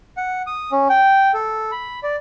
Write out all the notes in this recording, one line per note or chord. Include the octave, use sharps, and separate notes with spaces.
F#5
D#6
C#4
G5
A4
B5
D5